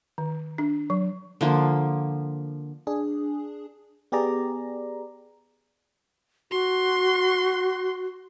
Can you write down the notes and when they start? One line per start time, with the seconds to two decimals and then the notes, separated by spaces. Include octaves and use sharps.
0.18 D#3
0.58 D4
0.90 F#3
1.41 D3 F3 A#3
2.87 D4 G#4
4.12 B3 G4 G#4 D5 A#5
6.51 F#4 C6